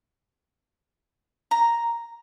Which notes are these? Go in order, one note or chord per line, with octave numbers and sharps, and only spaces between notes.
A#5